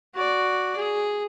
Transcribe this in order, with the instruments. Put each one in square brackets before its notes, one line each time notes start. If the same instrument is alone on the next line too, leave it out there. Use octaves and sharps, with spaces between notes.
[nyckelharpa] F#4 D5
G#4